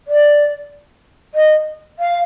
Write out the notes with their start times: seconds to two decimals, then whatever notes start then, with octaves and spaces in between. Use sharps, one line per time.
0.08 D5
1.34 D#5
1.99 F5